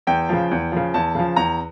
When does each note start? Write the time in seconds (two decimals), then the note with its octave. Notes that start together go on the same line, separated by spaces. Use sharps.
0.07 E2 G5
0.29 C#3 F3
0.51 E2
0.72 C#3 F3
0.94 E2 A5
1.15 C#3 F3
1.36 E2 A#5